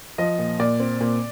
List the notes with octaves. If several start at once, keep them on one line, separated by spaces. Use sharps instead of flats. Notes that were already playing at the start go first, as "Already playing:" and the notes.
F3 D#5
A#2
A#2 D5
C4
A#2